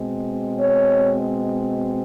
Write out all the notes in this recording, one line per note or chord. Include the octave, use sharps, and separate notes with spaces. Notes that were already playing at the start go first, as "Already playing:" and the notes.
Already playing: B2 G#3 C4
C#5